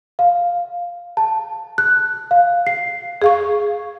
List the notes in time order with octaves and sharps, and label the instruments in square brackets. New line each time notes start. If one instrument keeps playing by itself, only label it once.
[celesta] F5
A5
F#6
F5
C7
[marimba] G#4 F5 C#6